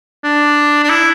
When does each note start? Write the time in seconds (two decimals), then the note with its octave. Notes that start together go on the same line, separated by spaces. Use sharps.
0.24 D4
0.83 D4
0.90 E4